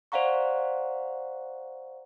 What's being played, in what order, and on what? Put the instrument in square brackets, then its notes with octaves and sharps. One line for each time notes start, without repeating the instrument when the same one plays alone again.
[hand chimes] C5 D5 F5 F#5 A#5 C#6